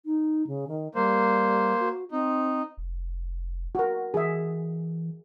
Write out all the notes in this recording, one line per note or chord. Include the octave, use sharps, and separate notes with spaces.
D#4
C#3
D#3
G3 A#3 C5
F#4
C4 D#4
F1
F#4 A#4
E3 G#4 E5